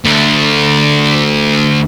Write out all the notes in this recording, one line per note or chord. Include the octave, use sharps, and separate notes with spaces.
D2 D3